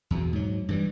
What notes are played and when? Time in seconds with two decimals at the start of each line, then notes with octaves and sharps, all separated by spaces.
0.11 E2 B2
0.33 G#2 F#3
0.69 G2 E3 G3